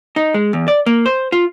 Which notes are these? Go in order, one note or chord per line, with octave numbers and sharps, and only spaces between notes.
D#4
G#3
E2
D5
A#3
C5
F4